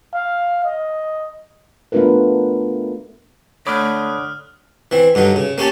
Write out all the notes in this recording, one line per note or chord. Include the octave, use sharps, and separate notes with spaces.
F5
D#5
A3 B3 D4 F4 A#4 B4
D3 A3 C#5 B5 D6 D#6 F6 F#6
E3 C4
G2 D3 F#3 D#4
C#3
A#3 C#4 G4 A5